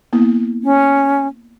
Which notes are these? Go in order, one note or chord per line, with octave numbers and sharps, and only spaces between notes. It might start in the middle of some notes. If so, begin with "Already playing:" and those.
A#3 B3 E4
C#4